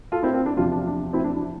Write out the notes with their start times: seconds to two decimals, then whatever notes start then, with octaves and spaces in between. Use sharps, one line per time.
0.12 F4 A4
0.23 C4 E4
0.34 C4
0.46 D4
0.56 E2 C3 F3 D4 F4
0.72 D4
0.87 D4
1.13 C4 E4
1.24 D4
1.37 D4